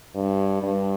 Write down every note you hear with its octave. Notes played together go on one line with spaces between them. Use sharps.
G2
G2